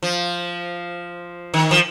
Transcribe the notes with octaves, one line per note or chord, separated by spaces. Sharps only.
F3
D#3
F3